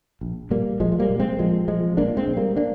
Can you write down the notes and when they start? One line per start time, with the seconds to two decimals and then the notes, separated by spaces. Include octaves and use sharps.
0.21 A#1
0.50 A#2 G3 A#3
0.80 A#1 F3 G#3
0.92 G#3
0.99 G3 A#3
1.10 A#2
1.20 G#3 C4
1.38 A#1 F3 G#3
1.68 A#2 F3 G#3
1.97 A#1 A#3 D4
2.17 G#3 C4
2.27 A#2
2.36 G3 A#3
2.57 A#3 D4